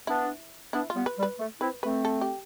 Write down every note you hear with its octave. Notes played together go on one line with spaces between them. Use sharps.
B3 D4 E4
B3 D4 E4
F4
G3 B3
B4
G3
B4
A3
C4 E4 B4
A3 C4 B4
A4
G4